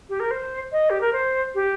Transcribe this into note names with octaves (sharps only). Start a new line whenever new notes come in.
G4
A#4
C5
D#5
G4
A#4
C5
G4